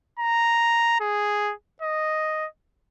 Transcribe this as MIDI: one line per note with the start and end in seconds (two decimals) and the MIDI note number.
0.19 0.96 82
1.01 1.53 68
1.82 2.47 75